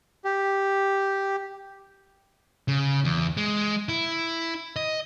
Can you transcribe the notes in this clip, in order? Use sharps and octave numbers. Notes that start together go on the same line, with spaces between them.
G4
C#3
E2
G#3
E4
D#5